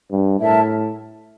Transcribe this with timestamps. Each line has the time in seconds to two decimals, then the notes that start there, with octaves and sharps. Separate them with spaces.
0.11 G2
0.39 A2 A#4 E5 A5